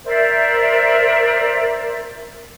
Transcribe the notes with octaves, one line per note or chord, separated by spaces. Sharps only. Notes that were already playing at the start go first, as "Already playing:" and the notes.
A#4 C5 D5 E5